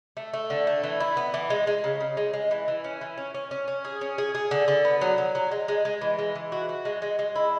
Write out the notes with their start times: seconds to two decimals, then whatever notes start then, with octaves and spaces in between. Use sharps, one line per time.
0.17 A3
0.33 A3
0.50 D3
0.67 A3
0.84 E3
1.00 E4
1.17 B3
1.34 E3
1.50 G#3
1.67 G#3
1.84 C#3
2.01 C#3
2.17 G#3
2.33 G#3
2.51 E3
2.68 E3
2.84 C#4
3.01 E3
3.18 C#4
3.34 C#4
3.51 C#4
3.68 C#4
3.85 G#4
4.01 C#4
4.18 G#4
4.35 G#4
4.51 D3
4.68 D3
4.85 B3
5.01 F#3
5.18 F#3
5.35 F#3
5.52 G#3
5.68 G#3
5.85 G#3
6.01 E3
6.19 G#3
6.35 E3
6.52 F#4
6.69 F#4
6.85 G#3
7.02 G#3
7.19 G#3
7.35 E4